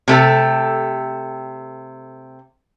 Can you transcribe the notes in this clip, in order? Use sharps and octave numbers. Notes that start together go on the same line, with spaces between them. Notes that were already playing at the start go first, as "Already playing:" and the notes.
C3 A3 A4